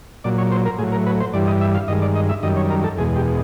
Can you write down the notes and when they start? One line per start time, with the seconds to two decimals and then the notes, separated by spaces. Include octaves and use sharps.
0.24 A#2 F#3 D5
0.38 C#5
0.52 C5
0.66 A#4
0.79 A2 G#4
0.83 F#3
0.92 A#4
1.06 B4
1.20 C5
1.33 G2 E3 G3 D5
1.47 D#5
1.61 E5
1.74 F5
1.88 G2 D#3 G#3 D#5
2.02 D5
2.15 D#5
2.29 E5
2.43 F#2 D#3 G3 D#5
2.57 C#5
2.70 A#4
2.84 A4
2.98 E2 B2 G#3 G#4
3.16 G4